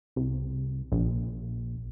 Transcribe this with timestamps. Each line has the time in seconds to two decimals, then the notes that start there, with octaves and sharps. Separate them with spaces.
0.16 C2
0.92 A#1